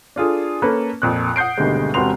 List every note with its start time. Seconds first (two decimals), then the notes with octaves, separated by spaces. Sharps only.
0.16 D4 F4 G#4 A4
0.62 A#3 C#4 A4 B4
1.02 F2 A#2 F#6
1.36 F#5 D#6 G6 C7 D7
1.57 G#1 D2 B2 D3 G3 G#3
1.94 E1 C3 F#4 B4 C6 F7